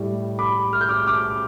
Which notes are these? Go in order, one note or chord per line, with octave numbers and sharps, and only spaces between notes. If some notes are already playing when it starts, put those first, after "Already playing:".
Already playing: A2 G3
B5 D6
F6
G6
D6 F6
D6 F6